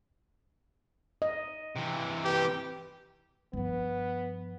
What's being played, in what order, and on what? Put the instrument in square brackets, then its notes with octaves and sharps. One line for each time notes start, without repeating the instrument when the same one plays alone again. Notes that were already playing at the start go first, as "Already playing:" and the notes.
[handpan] D#5
[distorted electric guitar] C3 E3
[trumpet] G4 [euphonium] B4
[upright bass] G2 F3 [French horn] B3